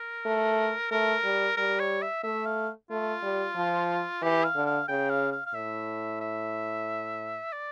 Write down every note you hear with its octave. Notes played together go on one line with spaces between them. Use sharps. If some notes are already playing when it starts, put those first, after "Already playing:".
Already playing: A#4
A3
A3 A#4
G3
G3 A#4
C#5
E5
A3 E5
F5
A3 F4
G3
F3
E3 G4
F5
D3
F5
C#3 G5
F5
F5
F5
A2 E5
E5
D5